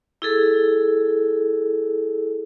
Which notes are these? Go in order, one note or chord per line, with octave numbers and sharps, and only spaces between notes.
E4 G#4 A4